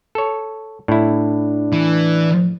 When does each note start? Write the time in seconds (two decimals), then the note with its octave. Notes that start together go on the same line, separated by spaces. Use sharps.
0.15 A4 C#5
0.88 A2 D4 E4
1.73 E3